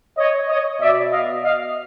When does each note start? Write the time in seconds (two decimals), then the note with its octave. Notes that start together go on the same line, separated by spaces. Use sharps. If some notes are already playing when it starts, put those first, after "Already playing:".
0.18 C#5 D#5
0.48 C#5 D#5
0.80 B2 D5 E5
1.11 D#5 F5
1.43 D#5 F5